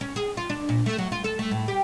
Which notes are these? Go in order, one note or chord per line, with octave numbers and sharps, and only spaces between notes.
C#4
G#4
F4
D4
A#2
A3
F#3
F4
A4
A3
A2
G4